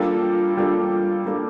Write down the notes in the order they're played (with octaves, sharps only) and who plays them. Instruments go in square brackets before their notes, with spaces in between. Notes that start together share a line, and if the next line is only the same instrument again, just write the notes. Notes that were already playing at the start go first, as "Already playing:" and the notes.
Already playing: [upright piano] G3 A#3 D4 A4 [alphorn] F4
[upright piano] G3 A#3 D4 A4 [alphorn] F4
[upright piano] G3 A#3 D4 A4